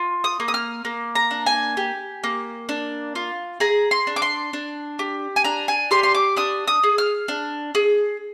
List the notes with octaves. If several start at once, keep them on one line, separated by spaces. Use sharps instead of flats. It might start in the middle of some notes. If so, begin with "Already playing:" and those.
Already playing: F4
D#6
A#3
D#6
F6
A#3
A#5
D4
G#5
G4
A#3
D4
F4
G#4 A#5
C6
D4
D6
C6
D4
G4
G#5
D4 A#5
G#5
G4 C6
C6
D6
D4 D#6
D#6
G#4
F6
D4
G#4